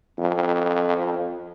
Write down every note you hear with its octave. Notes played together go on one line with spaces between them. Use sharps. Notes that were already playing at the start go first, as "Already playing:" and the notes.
F2